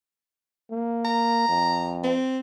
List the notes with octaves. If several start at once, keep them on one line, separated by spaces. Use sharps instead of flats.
A#3
A#5
F2
C4